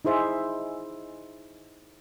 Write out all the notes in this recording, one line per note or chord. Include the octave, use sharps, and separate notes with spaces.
D#4 E4 G#4 C5 E5